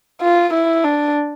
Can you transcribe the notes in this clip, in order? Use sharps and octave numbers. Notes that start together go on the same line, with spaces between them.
F4
E4
D4